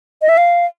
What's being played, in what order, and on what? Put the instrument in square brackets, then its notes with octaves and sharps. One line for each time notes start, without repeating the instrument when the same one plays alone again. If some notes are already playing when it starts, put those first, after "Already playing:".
[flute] D#5
E5
F5